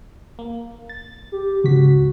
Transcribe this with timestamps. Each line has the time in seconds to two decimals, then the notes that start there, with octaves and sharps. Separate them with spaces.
0.39 A#3
0.89 A6
1.32 G4
1.64 C#2 G#2 F#4 B6